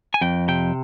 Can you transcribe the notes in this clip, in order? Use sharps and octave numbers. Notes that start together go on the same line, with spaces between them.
G#5
F2 G5
C3 G5